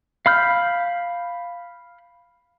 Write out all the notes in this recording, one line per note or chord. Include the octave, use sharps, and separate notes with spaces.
F5 B5 F6 G6